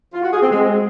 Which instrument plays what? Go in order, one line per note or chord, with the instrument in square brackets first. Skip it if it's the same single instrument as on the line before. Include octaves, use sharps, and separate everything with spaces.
[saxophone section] F4
F#4
G#4
C4
G#3